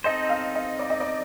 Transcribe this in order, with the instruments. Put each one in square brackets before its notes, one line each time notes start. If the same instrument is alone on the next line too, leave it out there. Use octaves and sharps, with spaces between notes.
[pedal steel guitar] C4 D#4 A4 C5 [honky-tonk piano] D#5
[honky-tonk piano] F5
D#5
D5
D#5
D5